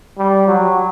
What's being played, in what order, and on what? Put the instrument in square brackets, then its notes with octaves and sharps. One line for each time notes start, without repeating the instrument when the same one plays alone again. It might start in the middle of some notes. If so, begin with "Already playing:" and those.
[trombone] G3
F#3